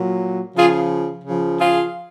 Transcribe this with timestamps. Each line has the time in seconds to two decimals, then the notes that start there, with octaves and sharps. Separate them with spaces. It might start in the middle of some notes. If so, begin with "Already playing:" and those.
Already playing: A#2 F#3
0.55 C#3 F3 F4 G#4
1.25 C#3 F3
1.59 F4 G#4